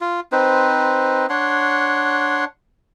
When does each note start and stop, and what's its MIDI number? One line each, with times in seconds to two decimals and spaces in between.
0.01 0.20 65
0.32 1.26 60
0.32 1.26 63
0.32 1.26 71
0.32 1.26 72
1.29 2.45 62
1.29 2.45 73
1.29 2.45 78
1.29 2.45 84